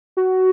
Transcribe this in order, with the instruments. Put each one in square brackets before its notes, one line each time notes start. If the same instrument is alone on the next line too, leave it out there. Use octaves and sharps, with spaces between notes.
[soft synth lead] F#4